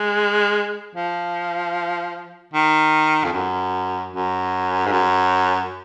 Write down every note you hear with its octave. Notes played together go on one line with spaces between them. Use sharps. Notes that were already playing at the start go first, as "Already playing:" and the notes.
Already playing: G#3
F3
D#3
F2
F#2
F#2
G#2
F#2